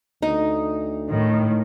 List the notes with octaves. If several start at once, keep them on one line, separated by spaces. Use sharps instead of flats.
D2 D#4
A2 D#3